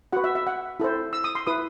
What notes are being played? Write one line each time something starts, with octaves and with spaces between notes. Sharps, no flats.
F#4 B4 F#5
E5
E5
F#5
E4 A4 C5
E6
D#6
C6
E4 B4 D#6